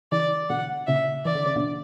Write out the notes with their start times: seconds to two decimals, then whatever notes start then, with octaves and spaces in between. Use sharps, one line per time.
0.12 C#3 E3 D5
0.50 B2 D3 F#5
0.87 A#2 C#3 E5
1.25 E3 D5
1.35 D3
1.46 C#3
1.56 B2 D3